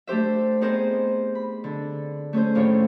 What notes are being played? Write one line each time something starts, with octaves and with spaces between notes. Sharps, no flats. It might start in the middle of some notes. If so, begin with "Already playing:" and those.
A3 D4 G4 C5 E5
B3 C4 D#4 G#4 A#4 C5
B5
D3
A3 C#4 G#4 C5
D#2 A2 F4 C#5